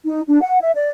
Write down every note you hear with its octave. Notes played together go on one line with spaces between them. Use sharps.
D#4
D4
F#5
E5
D5